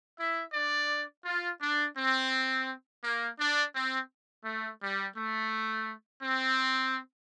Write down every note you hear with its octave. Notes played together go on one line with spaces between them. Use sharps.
E4 E5
D4 D5
F4
D4
C4
A#3
D4
C4
A3
G3
A3
C4